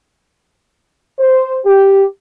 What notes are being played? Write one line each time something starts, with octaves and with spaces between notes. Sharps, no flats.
C5
G4